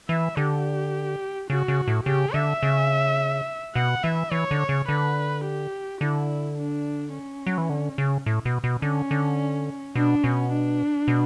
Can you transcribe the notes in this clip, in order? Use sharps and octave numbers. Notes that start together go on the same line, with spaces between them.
E3 E5
D3 G4
C#3 F#4
C#3
A2
C#3 G4
D3 E5
C#3
B2 F#5
E3 E5
E3 C#5
D3
C#5
C#3
D3 B4
G4
D3 E4
D4
C#4
F#3
E3
D3
C#3
A2
B2
B2
D3 C#4
D3
B2 D4
B2 C#4
D4
B2